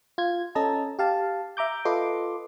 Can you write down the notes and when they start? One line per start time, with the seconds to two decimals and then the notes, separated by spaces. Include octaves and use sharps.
0.18 F4 G#6
0.55 C#4 A4 D#5 A5 A#5
0.99 G4 F5 A5
1.57 E5 A#5 D6 G6
1.85 F4 A4 B4 D#5 C6 D6